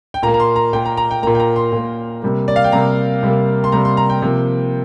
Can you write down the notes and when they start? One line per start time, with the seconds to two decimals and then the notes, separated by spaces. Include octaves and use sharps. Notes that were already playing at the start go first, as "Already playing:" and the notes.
0.14 G5
0.23 A#2 A#5
0.27 A#3
0.34 A#5
0.40 C6
0.56 A#5
0.73 A#2 A#3 G5
0.86 A#5
0.97 A#5
1.11 G5
1.23 A#2 A#3 A#5
1.35 G5
1.40 A#5
1.56 C6
1.72 A#2 A#3
2.23 C3 G3 A#3
2.48 D5
2.56 F5
2.64 G5
2.72 C3 G3 A#3 A#5
3.23 C3 G3 A#3
3.64 C6
3.72 C3 G3 A#3 A#5
3.85 C6
3.97 A#5
4.10 G5
4.22 C3 F3 A#3